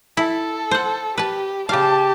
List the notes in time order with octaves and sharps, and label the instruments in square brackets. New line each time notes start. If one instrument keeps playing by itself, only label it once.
[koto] E4 [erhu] A4
[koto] C5 F#5
[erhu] G4 [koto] B4 A5
[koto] C#3 F5 [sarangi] G4 [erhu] A5